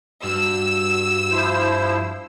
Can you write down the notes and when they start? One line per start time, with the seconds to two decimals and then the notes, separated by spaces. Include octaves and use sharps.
0.24 G2 F#4 E6
1.31 F3 E4 C5